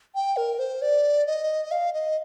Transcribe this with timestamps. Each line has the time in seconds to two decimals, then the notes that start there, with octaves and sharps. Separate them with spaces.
0.15 G5
0.37 A#4
0.59 C5
0.82 D5
1.27 D#5
1.71 F5
1.93 D#5